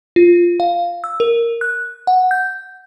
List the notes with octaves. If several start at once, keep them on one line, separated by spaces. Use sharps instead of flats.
F4
F5
E6
A#4
F#6
F#5
G6